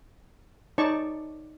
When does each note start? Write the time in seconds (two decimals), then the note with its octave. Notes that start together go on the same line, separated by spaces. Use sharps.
0.78 D#4 C#5 D5 A5 C#6